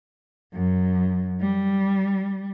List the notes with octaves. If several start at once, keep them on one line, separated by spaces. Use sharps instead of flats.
F#2
G3